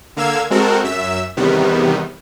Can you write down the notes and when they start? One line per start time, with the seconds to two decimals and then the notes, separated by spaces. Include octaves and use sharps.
0.17 D3 A#3 F5 E6 G#6
0.50 G#3 C4 F#4 A4 A#4
0.84 F#2 E5 E6
1.37 E2 C3 D#3 G3 B3